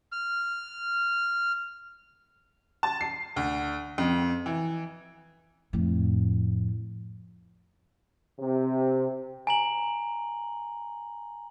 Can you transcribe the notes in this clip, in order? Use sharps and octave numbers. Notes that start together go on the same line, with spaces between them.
F6
A5
C7
D2
F2
E3
F2 A2
C3
G#5 A#5 F#7